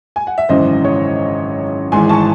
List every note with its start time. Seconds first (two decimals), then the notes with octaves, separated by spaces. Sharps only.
0.16 G#5
0.27 F#5
0.38 E5
0.49 G#1 F#2 C#3 E3 C5 D#5
0.85 C#5
1.92 G#1 G#2 E3 G#5 C6
2.09 A5 C#6